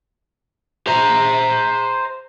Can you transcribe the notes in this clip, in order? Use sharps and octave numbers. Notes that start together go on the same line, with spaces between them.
C5 A#5